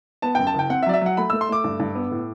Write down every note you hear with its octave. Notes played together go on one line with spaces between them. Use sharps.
B3 A5
F#2 G5
A5
F#1
G5
C4 F#5
E5
F#3 D5
E5
F#3 F#5
A3 B5
A3 E6
C6
A3 D6
G2
G2
B3
A2